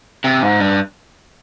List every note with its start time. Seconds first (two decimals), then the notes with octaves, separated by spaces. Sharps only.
0.24 C3
0.43 G#2
0.60 G2